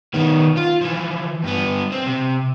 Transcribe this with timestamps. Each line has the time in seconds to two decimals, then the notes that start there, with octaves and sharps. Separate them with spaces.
0.14 D#3 B3
0.57 F4
0.81 E3 F3
1.44 G2 B3
1.92 C4
2.07 C3